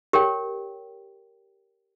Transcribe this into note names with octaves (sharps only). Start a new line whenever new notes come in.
G4 A#4 C#5 G5